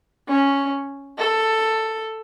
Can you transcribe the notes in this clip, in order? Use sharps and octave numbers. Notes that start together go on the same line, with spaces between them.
C#4
A4